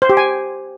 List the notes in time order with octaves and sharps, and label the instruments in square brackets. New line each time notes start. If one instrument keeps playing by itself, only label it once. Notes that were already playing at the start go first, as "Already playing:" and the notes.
[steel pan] C5
G4
G#5